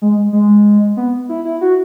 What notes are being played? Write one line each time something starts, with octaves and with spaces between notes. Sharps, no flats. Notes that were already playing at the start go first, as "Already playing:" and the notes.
G#3
G#3
B3
E4
E4
F#4